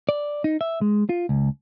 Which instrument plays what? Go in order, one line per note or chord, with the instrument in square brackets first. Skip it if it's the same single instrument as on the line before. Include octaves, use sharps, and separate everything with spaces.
[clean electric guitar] D5
D#4
E5
G#3
F4
C#2